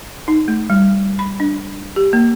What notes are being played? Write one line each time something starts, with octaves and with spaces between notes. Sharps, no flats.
D#4
A3
G3
B5
D4
G4
A#3